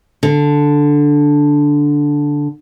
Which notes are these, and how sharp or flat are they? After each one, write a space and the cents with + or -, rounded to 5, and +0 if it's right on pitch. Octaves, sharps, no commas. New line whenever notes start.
D3 -5